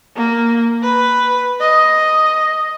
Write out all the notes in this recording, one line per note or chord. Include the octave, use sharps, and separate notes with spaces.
A#3
B4
D#5